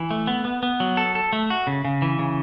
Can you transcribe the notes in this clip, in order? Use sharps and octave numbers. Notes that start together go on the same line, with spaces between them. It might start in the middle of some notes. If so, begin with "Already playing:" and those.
Already playing: E3
A3
B3
B3
B3
F#3
A4
A4
A3
F#4
C#3
C#3
E3
C#3